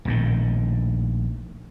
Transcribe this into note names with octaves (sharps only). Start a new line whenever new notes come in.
A#1 A2 D3 D#3